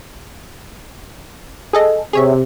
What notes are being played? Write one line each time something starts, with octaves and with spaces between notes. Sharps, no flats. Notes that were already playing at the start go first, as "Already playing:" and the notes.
G#4 A4 D#5
C3 G#4 C#5 E5